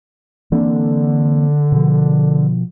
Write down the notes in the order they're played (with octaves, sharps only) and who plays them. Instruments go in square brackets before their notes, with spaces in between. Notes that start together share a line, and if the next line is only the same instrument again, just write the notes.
[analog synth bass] D3 [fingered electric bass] E3 A#3 C4
[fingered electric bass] B2 F3